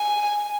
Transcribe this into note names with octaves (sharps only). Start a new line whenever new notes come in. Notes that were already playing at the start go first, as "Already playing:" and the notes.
Already playing: G#5